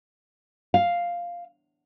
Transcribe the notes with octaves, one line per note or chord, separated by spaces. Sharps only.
F5